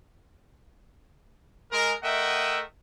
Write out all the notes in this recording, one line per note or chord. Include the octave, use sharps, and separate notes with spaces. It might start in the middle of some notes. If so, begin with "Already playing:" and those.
G#3 A#4
A3 A#4 D#5 E5 F#5 G5